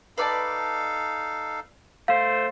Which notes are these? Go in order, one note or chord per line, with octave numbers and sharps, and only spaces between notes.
D#4 A4 B4 D5 F5 A5
A3 C5 F5